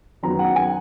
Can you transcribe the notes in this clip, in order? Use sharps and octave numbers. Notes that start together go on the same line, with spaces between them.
F#2 D#3 F#3 B3 A#5
F#5
G#5